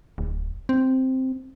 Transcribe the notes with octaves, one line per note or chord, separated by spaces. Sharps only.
D1
C4